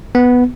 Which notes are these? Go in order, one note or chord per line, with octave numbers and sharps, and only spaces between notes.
B3